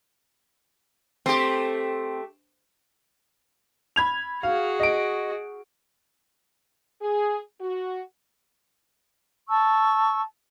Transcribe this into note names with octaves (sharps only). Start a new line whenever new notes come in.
A3 C4 G4
B5 G#6 F7
F#4 G#4 F5
D#5 D7
G#4
F#4
A5 C#6 E6